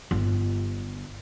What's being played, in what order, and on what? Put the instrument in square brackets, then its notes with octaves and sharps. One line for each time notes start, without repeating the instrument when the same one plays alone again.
[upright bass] G1